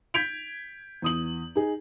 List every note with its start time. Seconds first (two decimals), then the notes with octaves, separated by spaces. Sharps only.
0.14 G6 G#6 B6 D7 F7
1.02 E2 D#6 F#7
1.55 D#4 G#4